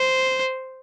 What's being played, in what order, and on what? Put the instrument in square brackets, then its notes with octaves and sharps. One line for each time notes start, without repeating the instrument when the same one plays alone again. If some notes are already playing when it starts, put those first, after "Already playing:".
Already playing: [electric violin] C5